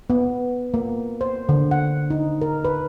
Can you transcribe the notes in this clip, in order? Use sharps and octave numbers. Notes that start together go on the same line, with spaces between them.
B3
A#3
C5
D3
F#5
D#4
A#4
B4